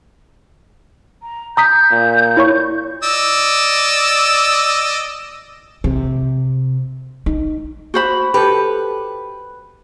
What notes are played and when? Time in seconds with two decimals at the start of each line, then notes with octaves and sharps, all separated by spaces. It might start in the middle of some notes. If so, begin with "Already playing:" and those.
1.22 A#5
1.57 A#5 D#6 G6 B6
1.91 A#2
2.37 E4 C#5 C#6
3.03 D5 D#5 E6
5.84 C3
7.26 D#4
7.94 F#4 C5 B5
8.34 G4 A4 B4